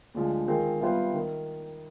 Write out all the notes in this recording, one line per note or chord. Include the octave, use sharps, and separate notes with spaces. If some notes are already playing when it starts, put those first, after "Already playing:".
D2 D3 F3 G#3
D#3 G#3 C4 F4 G#4
C3 G3 B3 F4 C5
D#3